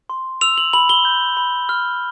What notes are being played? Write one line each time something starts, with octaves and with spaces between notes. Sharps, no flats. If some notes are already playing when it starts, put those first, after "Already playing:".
C6
E6 F7
F#7
B5 F#7
G7
G6
B5
F6